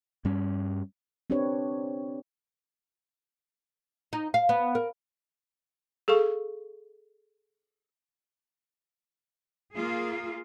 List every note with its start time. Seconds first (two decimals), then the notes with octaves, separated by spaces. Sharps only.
0.25 G2 G3 C#4
1.30 C4 D4 G4 B4 C#5
4.13 D#4
4.34 F5
4.49 B3
4.75 A#4
6.08 G#4 A4 F5 C#6
9.73 A#3 F4 G#4